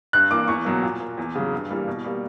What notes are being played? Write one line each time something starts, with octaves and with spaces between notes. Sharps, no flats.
G2 F#6
E3 A#3 D6
E2 C#6
B2 F#3 A#3
A#2
A#3
E2
C#3 F#3
G2
E3 G3 A#3
B2
G3 A#3